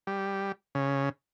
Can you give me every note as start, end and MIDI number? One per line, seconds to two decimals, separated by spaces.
0.07 0.52 55
0.75 1.09 49